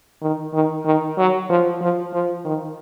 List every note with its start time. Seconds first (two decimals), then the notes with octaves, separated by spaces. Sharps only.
0.22 D#3
0.53 D#3
0.85 D#3
1.18 F#3
1.50 F3
1.81 F3
2.13 F3
2.45 D#3